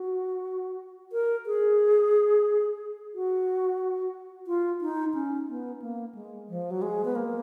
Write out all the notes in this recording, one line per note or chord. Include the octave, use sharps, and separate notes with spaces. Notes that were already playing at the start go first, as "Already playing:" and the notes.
Already playing: F#4
A#4
G#4
F#4
F4
D#4
C#4
B3
A#3
G#3
F3
F#3
G#3
B3
A#3